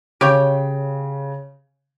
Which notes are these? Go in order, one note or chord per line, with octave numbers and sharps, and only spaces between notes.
C#3 G4 C#5 G5